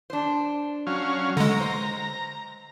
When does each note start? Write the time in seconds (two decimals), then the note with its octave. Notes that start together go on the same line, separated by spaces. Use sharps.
0.10 D4 C5
0.87 F#3 C#4 F5
1.37 D3 G#3 A#5
1.60 C5